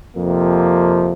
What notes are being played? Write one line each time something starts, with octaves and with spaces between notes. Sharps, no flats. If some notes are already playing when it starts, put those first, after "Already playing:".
F2 C3 F3 A#3